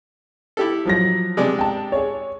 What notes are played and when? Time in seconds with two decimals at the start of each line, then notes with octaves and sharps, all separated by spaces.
0.57 E4 G4 A4
0.85 F3 F#3 A#6
1.37 C3 G#3 D4
1.59 G5 A5
1.92 G#4 C#5